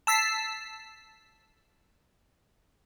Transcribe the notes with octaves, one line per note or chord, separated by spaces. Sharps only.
A5 E6 B6 C7